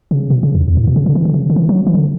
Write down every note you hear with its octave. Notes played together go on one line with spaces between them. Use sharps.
C#3
B2
C#3
E2
E2
A2
B2
C#3
D3
E3
D3
C#3
D3
E3
F#3
E3
D3